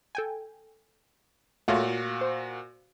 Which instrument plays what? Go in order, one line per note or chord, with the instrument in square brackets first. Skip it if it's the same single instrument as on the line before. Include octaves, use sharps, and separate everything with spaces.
[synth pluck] A4 G5 G#5
[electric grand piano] A#2 F#4 F5 [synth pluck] A3 F4 C#5
[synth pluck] C5